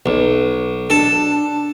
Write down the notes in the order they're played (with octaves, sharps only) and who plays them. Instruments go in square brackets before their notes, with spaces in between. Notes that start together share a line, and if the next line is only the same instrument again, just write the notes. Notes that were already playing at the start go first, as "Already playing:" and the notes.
[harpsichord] B1
[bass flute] D4 [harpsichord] A4